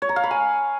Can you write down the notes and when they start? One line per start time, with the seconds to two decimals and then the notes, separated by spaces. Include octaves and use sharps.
0.02 C#5
0.09 A#5
0.16 F5
0.23 B5
0.31 G#5